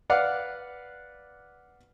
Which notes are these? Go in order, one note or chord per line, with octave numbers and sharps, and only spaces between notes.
B4 D5 F5 F#5